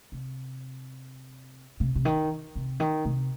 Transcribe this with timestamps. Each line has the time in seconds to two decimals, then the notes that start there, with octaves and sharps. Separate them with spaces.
0.12 C3
1.80 C3
1.95 C3
2.05 D#3
2.55 C3
2.80 D#3
3.05 C3